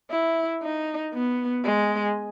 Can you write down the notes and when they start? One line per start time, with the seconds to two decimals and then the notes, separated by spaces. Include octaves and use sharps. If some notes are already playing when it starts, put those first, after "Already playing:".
0.11 E4
0.62 D#4
1.14 B3
1.65 G#3